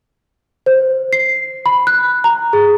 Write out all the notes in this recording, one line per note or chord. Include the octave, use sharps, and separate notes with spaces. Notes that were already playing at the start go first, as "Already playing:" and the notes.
C5
C7
B5
F#6
A#5
G#4